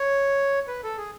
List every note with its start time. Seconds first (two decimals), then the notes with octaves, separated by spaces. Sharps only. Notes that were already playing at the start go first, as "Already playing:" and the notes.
Already playing: C#5
0.68 B4
0.83 A4
0.97 G#4